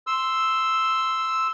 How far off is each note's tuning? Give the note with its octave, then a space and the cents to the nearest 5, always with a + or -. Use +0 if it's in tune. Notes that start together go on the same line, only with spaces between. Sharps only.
C6 +0 E6 +0